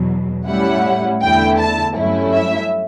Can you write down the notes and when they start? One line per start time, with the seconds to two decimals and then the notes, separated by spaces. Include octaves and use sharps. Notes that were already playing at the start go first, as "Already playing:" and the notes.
Already playing: E2 B2 F#3
0.46 A2 G3 C#4 E4 F#5
1.22 E2 D3 A3 E4 G5
1.59 A5
1.96 G2 F#3 A3 C#4 E4
2.33 E5